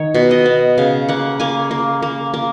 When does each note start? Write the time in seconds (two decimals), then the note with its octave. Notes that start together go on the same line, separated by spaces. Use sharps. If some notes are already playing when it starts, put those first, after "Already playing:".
Already playing: D#3 C#5
0.14 B2
0.31 D#5
0.46 B3
0.78 C#3 F5
1.09 A#3 F#5
1.40 A#3 G#5
1.71 A#3
2.02 A#3
2.34 A#3